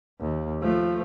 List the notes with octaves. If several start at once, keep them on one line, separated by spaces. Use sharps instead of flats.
D#2
F3 A3